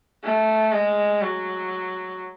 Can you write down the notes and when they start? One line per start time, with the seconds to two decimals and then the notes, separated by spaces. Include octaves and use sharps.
0.23 A3
0.72 G#3
1.21 F#3